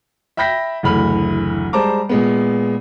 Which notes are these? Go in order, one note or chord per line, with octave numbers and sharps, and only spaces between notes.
E5 G5 B5 G6 A#6 B6
F#1 D2 E3 B5 F6
G3 G#3 C5 A5 A#5 D6
A#2 G#3 B3